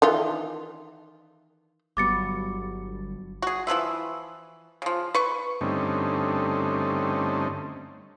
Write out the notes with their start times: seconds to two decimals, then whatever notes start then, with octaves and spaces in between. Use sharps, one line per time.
0.02 D#3 E3 F4
1.97 G1 G2 F#3 B3 D6 A6 C#7
3.42 F#4 G#4
3.67 E3 F3 B4 E5
4.82 C#3 F3
5.15 B4 C#6
5.61 G2 D3 A3 C4 C#4 D#4